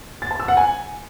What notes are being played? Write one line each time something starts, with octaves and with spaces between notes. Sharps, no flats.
A6
A5
E6
F#5
G#5